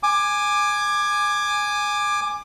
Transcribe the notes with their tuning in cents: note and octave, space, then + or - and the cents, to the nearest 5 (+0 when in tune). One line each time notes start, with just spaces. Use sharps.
G#5 +0 D6 +20